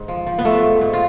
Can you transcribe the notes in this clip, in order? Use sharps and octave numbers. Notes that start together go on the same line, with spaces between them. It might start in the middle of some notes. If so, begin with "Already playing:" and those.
Already playing: G#2
F3
F3
B3
F3 A3
G#2
G#2
F4